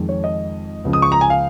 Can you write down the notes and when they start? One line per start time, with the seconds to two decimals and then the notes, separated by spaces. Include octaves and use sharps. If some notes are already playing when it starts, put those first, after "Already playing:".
Already playing: F2 D#3 G#3
0.09 C#5
0.24 D#5
0.85 C#2 C#3 F3
0.93 D#6
1.02 C#6
1.12 A#5
1.21 G#5
1.30 F5